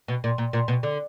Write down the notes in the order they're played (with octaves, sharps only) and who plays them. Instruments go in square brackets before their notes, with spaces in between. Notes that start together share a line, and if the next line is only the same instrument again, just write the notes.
[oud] B2
A#2
A#2
A#2
B2
D3